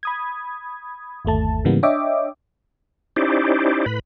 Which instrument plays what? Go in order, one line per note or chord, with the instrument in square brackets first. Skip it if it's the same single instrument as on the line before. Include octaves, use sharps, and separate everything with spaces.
[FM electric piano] B5 D#6 G#6
G1 D#2 A3 A5
G#2 C#3 E3 G3 A#3 B3
D4 C#5 D#5 E5 G5 D6
[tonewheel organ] C#4 D#4 E4 G4 C5 D5
A2 B4 B5